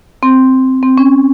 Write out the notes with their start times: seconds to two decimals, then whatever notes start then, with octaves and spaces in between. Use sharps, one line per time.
0.23 C4
0.83 C4
0.98 C#4